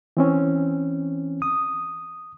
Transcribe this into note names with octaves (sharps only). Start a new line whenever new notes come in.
E3 C4 C#4
D#6